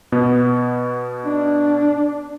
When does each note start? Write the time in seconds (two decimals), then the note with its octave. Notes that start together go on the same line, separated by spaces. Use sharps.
0.12 B2 B3
1.26 D4